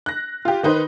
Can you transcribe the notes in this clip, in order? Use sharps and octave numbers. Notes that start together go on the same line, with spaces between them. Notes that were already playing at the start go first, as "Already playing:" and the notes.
F#6 A#6
F4 G4
D#3 D#4 B4 C5